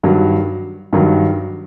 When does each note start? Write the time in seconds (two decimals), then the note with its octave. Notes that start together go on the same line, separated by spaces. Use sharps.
0.03 G2 D#3 F#3
0.93 G2 D#3 F#3